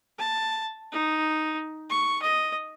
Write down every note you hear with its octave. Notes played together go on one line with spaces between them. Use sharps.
A5
D#4
C#6
D#5